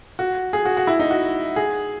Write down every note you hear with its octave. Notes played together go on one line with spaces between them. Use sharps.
F#4
G#4
F#4
F#4
E4
D#4
F#4
G#4